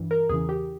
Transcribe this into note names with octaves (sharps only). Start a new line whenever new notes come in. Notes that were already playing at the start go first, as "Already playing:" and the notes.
Already playing: G2 E3
A#4
E2 C#3 E3 G#4
G4